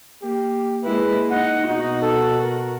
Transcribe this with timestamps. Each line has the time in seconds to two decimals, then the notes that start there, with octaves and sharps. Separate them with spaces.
0.22 A#3 G4
0.83 G#3 A#3 E4 B4
1.31 D#4 F#5
1.68 B2 D#4 F#4
2.02 A4
2.44 A#4